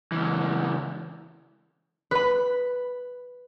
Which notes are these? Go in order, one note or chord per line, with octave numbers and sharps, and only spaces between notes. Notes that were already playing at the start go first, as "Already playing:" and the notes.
C#2 E3
B4 B5